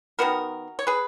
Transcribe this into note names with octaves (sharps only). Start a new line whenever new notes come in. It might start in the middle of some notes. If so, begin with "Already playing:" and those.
D#3 F#3 B3 F#4 A#4
C#5
G#4 B4